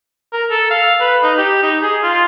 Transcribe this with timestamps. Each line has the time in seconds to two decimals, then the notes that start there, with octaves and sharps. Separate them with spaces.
0.33 A#4
0.51 A4
0.71 F5
1.01 B4
1.23 D#4
1.38 G4
1.63 D#4
1.83 G#4
2.03 F4